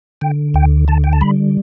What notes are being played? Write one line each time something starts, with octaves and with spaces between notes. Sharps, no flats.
D3 G5
D2 G5
D3 A5
G5
A5
G3 B5